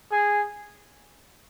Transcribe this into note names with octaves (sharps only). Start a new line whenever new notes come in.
G#4